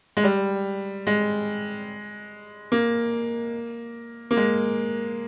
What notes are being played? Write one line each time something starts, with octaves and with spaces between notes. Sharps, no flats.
G#3
G3
G#3
A#3
A#3
G#3